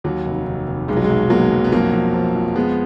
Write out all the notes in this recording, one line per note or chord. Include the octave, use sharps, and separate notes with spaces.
D#2 F#3
F1
F1
F1
B1 G#3
F#3
G#3
B1
B2 F#3 A#3
B1
B3
F2 F#3 A#3
F2
F3
F2
F3 G#3 B3